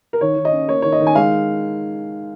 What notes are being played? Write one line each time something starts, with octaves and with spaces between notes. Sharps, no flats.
A#4
D#3 C#5
D#3
D#5
C#4
A#3 C#5
D#3 C#5
D#5
D#3
G#5
G#3 F5